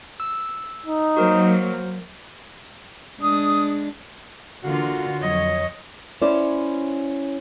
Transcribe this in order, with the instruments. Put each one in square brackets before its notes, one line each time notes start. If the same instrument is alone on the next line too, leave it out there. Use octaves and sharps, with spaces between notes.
[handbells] E6
[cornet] D#4
[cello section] F#3 A#3 [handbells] F#4 A#4 C5
[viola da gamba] G#3 D4 [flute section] D#6
[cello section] D3 E3 F4 [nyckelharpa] A#3 F5 [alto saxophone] F#4
[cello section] F2 F#3 C#5 [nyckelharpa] D#5
[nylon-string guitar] C#4 E4 C5 D5